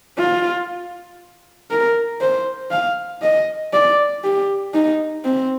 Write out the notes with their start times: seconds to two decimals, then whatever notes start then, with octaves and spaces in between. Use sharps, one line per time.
0.18 F4
1.71 A#4
2.21 C5
2.71 F5
3.22 D#5
3.73 D5
4.24 G4
4.74 D#4
5.25 C4